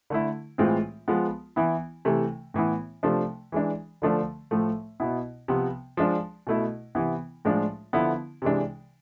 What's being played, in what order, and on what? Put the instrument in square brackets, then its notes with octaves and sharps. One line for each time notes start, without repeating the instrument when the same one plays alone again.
[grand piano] D3 A3 E4
A2 E3 G#3 C4 F4
F3 G#3 B3 F4
E3 B3 E4
C3 E3 A3
A2 E3 B3 E4
C3 F3 A3 D4
E3 G#3 D4
D3 F3 A3 D4
A2 F3 A3
B2 B3 E4
C3 F3 B3
F3 G#3 D4
B2 A3 E4
C3 E3 B3 E4
A2 F3 G#3 D4 F4
D3 F3 B3 E4
C3 E3 G#3 D4